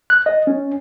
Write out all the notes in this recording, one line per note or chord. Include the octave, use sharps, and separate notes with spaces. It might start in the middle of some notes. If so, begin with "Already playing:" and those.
F#6
D#5
C#4